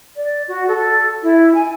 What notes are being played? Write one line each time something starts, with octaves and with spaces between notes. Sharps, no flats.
D5
F#4
A4
E4
G#5